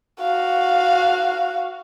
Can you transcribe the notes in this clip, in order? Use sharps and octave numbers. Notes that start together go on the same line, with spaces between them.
F#4 F5